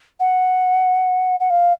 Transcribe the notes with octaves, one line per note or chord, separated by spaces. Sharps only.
F#5
F#5
F5